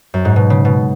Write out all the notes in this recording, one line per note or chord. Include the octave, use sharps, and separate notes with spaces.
F#2
G#2
B2
C#3
B2